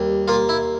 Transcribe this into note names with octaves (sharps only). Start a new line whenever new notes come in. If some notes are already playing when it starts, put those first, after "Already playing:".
Already playing: D#2 G3
A#3 F4
E4